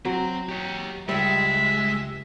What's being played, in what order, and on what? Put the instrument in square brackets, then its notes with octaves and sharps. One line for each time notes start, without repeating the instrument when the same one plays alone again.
[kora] F#3 [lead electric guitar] C4
[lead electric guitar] G4 C#5
[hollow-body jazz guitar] C#2 G3 [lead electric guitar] G#3 [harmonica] E5